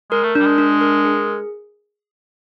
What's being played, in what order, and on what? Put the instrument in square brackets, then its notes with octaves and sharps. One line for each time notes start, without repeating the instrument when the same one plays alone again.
[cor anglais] G#3 [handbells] A#4
[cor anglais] A3
[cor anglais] G3 [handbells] D4
[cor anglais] G#3
[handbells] D4
A#4
G#4